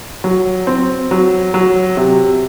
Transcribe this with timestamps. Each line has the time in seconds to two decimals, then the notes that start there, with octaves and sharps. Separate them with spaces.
0.24 F#3
0.67 C4
1.11 F#3
1.54 F#3
1.97 C3